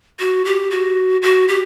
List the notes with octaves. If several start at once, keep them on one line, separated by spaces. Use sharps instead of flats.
F#4
G4
F#4
F#4
G4